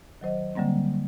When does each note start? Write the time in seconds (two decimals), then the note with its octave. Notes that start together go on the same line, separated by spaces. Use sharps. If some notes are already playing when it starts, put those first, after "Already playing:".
0.21 D#3 F#3 C5 D#5
0.55 D3 F#3 G3 A#3 C4